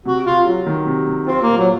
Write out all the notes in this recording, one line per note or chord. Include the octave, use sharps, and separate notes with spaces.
C3 F#4
C3 F4
F#3
D#3
C3
C3
C4 F4
A#3
A#2
F#3